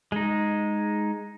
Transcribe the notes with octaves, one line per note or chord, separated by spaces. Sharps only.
G#3 D#4